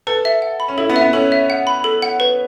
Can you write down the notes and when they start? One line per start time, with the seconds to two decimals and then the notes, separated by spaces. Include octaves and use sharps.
0.07 A4 B4
0.25 E5
0.42 F#5
0.60 B5
0.68 C#4
0.78 E4 A4
0.90 B3
0.96 E5
1.01 B3
1.13 C#4 A4
1.32 E5
1.50 F#5
1.67 B5
1.84 A4
2.02 F#5
2.20 B4